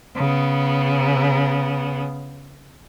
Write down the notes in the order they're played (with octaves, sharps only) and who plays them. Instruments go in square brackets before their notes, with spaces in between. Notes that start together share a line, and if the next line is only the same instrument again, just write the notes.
[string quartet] C#3 B3